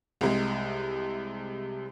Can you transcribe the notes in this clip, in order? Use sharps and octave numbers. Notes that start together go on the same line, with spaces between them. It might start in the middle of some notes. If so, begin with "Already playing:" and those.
C2 C3 G#3